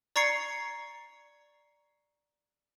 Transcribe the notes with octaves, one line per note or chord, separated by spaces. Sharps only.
D5 A#5 C#6 G#6 C7 C#7